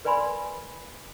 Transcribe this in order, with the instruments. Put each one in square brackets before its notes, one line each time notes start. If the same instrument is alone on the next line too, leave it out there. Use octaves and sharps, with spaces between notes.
[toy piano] A#4 B4 D5 G#5 B5 C6